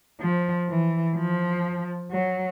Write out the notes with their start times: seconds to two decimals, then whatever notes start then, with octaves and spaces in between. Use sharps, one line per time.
0.21 F3
0.69 E3
1.16 F3
2.11 F#3